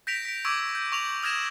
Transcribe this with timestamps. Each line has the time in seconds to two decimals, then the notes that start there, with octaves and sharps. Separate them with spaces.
0.07 G6 A#6 B6 D7 F7
0.25 B6 D7
0.45 C#6 D6 E6 G#6 D7
0.75 G6
0.92 C#6 F7 F#7
1.23 D#6 F6 G#6 A#6 E7